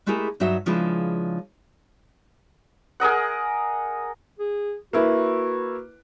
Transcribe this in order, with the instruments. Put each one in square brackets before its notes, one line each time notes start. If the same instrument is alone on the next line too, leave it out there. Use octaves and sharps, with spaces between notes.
[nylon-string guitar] G#3 A3 E4 G4 G#4 A#4
G2 F#3 D#4 F#4 E5
C#3 F3 G#3 D4 E4 B4
[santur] G#4 A#4 D#5 F#5
[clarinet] G#4
[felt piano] A#3 E4 B4 [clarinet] F#4